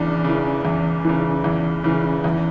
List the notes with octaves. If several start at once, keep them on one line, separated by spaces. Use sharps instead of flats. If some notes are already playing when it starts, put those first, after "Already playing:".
Already playing: E2 C#3 D4
C#3
E3
E2
C#3 E3
E2
C#3 E3
E2